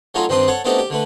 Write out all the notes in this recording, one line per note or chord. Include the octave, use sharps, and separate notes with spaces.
F#3 A3 C#4 D#4 F4
G2 D#3 C4 D4 C6 D#6
A4 C#5 F#5 A5
A3 B3 C4 D4 D#4 G4
G4
D3 A3 B4